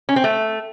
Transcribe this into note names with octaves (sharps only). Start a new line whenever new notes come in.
C#4
C4
A3